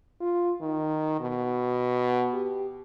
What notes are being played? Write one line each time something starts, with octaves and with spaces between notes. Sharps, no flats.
F4
D#3
B2
G4